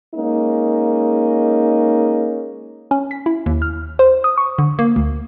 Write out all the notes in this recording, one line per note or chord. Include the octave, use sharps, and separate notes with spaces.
G#3 A#3 C#4 D#4
C#4
B6
E4
D#2
F6
C5
D#6
C#6
D3
A#3
D2